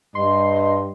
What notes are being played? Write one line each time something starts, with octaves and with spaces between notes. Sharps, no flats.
G2 D#5 C6